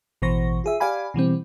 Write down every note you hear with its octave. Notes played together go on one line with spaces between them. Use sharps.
A1 B2 E3 C5 C#6 A#6
F4 G#4 E5
G4 D5 F5 G#5 B5
B2 E3 G3 C4